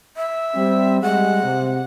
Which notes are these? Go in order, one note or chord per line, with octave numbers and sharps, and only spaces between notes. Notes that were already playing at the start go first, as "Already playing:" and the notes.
E5
G3 C4
G3 G#3 F#5
C3